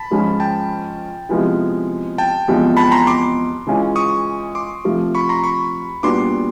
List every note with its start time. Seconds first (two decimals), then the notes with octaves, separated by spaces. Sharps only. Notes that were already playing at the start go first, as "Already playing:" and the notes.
Already playing: A5 B5
0.11 G#2 F3 G#3 C#4 F4
0.40 G5 A5
1.29 C3 F3 G#3 B3 E4
2.18 G5 A5
2.48 E2 C3 F3 G#3
2.77 A5 B5
2.92 A#5 C6
3.07 C6 D6
3.67 C#3 E3 G#3 C#4 F4
3.96 C#6 D#6
4.55 C6 D6
4.84 C3 F3 A3
5.15 B5 C#6
5.29 A#5 C6
5.44 B5 C#6
6.03 A#2 G3 B3 D4 F#4 C6 D6